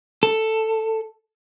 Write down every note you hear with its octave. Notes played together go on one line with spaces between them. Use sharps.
A4